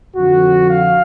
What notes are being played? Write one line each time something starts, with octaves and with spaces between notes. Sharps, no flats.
F2 D3 F3 F#4
F5